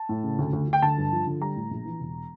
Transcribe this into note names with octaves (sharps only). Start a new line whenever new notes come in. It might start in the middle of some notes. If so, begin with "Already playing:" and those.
Already playing: A5
A2
C#3
D2
D2
D2
G5
D3 A5
G2
F3
D3
G3 A#5
A2
A#1
E3
E1